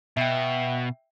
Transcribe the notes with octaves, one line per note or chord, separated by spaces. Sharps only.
B2 E5 G5